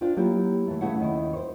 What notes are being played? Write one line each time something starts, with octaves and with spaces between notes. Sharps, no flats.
D4 F4 C5 G5
F#3 A#3 E4 G4
E3 A3
C#3 A3 E4 C#5 F#5
D#2 D#3 C#4 E4
C5 C#5